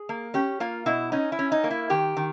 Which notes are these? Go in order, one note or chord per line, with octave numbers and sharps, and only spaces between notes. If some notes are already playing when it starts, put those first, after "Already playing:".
Already playing: G#4
A#3
C#4 G4
A#3 F4
B2 E4
C#4 D#4
E4
C#4
D#4
A#3
E4
D#3 G4
D#3